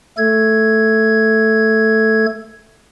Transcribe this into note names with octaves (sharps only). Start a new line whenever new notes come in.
A3 A4 G#6